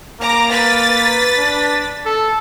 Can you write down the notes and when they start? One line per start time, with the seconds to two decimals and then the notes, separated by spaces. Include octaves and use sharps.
0.21 A#3 A#5 D6
0.51 B4 A6 B6
1.37 D4
2.06 A4